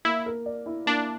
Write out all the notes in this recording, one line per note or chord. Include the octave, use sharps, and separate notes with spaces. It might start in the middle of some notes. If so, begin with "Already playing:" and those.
A#3 E4
A#4
D5
E4
A#3 D4